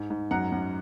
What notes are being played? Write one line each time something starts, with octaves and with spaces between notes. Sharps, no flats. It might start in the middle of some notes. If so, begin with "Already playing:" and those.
Already playing: G#2
G#2
F#2 F#5 A#5
F#2